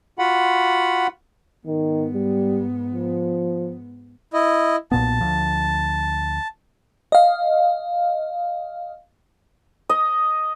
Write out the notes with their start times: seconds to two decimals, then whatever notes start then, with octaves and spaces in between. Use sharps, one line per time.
0.19 F4 F#4 F#5 B5
1.67 G#2 D#3 B3
2.14 G3
2.94 F3
4.34 E4 D#5
4.92 B1 A#2 B3 A5
5.20 D2 F3
7.12 D#5 F5
9.89 D#5